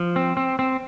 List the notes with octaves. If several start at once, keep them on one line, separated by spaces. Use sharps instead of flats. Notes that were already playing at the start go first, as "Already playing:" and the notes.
Already playing: F3
C4
C4
C4